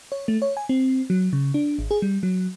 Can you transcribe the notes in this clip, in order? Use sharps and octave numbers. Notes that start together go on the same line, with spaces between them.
C#5
A3
C#5
G#5
C4
F#3
C#3
D4
G#1
G#4
G3
F#3